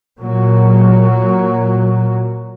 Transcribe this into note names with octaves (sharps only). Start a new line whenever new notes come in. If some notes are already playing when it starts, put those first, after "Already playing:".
A#2 F#3